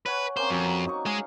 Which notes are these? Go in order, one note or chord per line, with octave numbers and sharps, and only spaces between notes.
B4 C#5 F#5 G#5
A#3 C4 C#4 C5
F2 F#3
D#4 D#5 C#6
G#3 G#4 F5